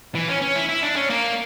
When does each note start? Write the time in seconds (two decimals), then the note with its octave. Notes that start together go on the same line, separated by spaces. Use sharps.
0.15 E3
0.28 C#4
0.42 C#4
0.56 E4
0.69 E4
0.82 D4
0.96 C#4
1.10 A#3